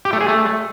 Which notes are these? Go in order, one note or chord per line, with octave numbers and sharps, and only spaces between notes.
G4
A3
G#4
A3